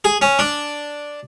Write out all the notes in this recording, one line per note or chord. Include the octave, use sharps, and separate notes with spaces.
G#4
C#4
D4